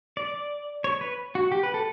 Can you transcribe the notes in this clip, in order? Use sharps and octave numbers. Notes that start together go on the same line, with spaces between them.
D5
C#5
B4
F#4
G4
B4
A4